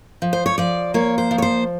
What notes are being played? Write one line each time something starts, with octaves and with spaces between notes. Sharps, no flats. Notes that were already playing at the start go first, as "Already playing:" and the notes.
F3
C5
C#5
F3 D5
A#3 C#5
C5
F3
C#5
C5